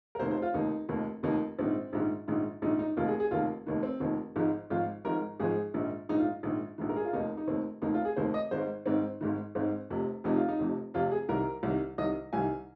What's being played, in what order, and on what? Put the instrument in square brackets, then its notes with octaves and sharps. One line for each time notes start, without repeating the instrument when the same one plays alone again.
[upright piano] A#4
F1 D#2 D#3 C5
C5
F4
F1 D#2 D#3 D#4
F1 D#2 D#3
F1 D#2 D#3 D#4
A#1 G#2 D#3 C4
A#1 G#2 D#3
A#1 G#2 D#3
A#1 G#2 D#3 D#4
D#4
F1 D#2 D#3 F4
G#4
G#4
F1 D#2 D#3 F4
F1 D#2 D#3
C4
F1 D#2 D#3
G#1 G#2 F3 D#4
G#1 G#2 F3 F4
G#1 G#2 F3 A#4
G#1 G#2 F3 G#4
A#1 G#2 D#3
A#1 G#2 D#3 D#4
F4
A#1 G#2 D#3
A#1 G#2 D#3
A#4
G#4
F4
F1 D#2 D#3 D#4
D#4
F1 D#2 D#3 C4
F1 D#2 D#3 D#4
F4
G#4
F1 D#2 D#3 C5
D#5
G#1 G#2 D#3 C5
G#1 G#2 D#3 C4
G#1 G#2 D#3
G#1 G#2 D#3 C4
F1 F2 C3
F1 F2 C3 D#4
F4
D#4
F1 F2 C3
F1 F2 C3 F4
G#4
C2 C3 D#3 A#4
C2 C3 D#3
C2 C3 D#3 D#5
C2 C3 D#3 G#5